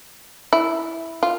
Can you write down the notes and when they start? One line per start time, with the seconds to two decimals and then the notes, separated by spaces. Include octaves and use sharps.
0.53 E4
1.23 F4